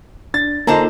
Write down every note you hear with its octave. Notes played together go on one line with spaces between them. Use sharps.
D4 A6
D3 A#3 D#4 F4 C5 D#5 A5 A#5